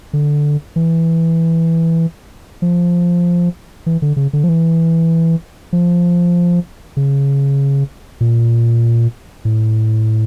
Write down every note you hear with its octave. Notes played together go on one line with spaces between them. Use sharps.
D3
E3
F3
E3
D3
C#3
D3
F3
E3
F3
C#3
A#2
A2